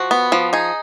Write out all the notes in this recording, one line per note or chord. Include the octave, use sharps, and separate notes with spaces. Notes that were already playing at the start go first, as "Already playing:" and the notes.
Already playing: F3 F#4
B3
F3
D#4 G#4